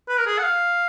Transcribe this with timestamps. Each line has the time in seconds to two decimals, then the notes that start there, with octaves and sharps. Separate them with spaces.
0.09 B4
0.18 A#4
0.27 G#4
0.39 F#5
0.43 F5